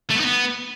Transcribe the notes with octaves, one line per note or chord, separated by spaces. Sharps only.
A3
B3
D#4
B3